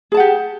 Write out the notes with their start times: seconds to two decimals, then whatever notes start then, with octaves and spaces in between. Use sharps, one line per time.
0.12 G#4
0.14 A5
0.17 F#5
0.20 G4